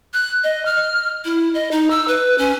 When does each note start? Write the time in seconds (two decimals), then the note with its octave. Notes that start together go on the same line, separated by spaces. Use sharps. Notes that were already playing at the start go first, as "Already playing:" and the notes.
0.14 F#6
0.44 D#5
0.65 F6
1.25 E4
1.54 D#5
1.71 D#4
1.90 E6
2.08 B4
2.38 C#4